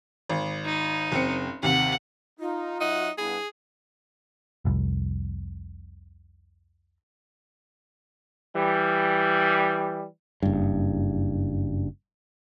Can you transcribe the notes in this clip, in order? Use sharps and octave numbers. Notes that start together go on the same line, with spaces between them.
G#1
D#4
F#1 C4 C#7
D#2 C3 F#5
D#4 F4
F#3 D#4 E5 F#5
G2 B3 E4 G#4
F1 C2
E3 G3
F#1 G2